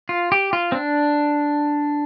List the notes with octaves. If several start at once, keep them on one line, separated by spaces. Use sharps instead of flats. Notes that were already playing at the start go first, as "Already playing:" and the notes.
F4
G4
F4
C4
D4